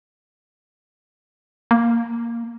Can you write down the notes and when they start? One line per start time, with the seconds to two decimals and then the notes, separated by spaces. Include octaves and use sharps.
1.71 A#3